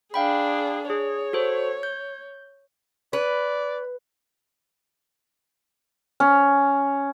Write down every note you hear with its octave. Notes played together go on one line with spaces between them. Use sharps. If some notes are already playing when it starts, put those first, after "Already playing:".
D4 G#4 F5 G5 B5
G#4 C#5
F#4 A4 C5
G6
B4 D5
C#4